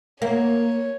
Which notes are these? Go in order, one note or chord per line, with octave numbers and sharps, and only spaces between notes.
A#3 C#5